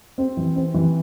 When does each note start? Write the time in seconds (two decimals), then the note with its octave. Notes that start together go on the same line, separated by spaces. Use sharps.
0.18 C4
0.37 E3
0.56 C4
0.74 E3